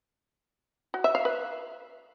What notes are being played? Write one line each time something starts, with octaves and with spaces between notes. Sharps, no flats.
F#4
E5
F5
B4